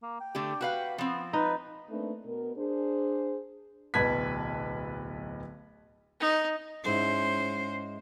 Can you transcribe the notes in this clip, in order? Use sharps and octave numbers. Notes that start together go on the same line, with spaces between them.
A#3
G5
D3 A3 G4
F#4 B4 F5
F3 B3 C4
D#4 B4
A3 A#3 C4 D4 D#4 B4
B2 A#4
D4 G#4 C5
D1 B1 B4 A5 G#6 B6
D#4
G#2 G#3 C#4 E4 C5